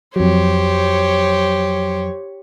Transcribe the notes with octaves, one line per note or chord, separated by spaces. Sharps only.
F2 F#3 G4 C5 C#5